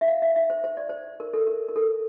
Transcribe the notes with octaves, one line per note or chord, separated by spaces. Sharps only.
E5
F5
E5
E5
C5
C5
D5
C5
A#4
A4
A#4
A#4
A4